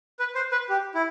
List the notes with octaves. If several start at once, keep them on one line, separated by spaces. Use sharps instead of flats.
B4
C5
B4
G4
E4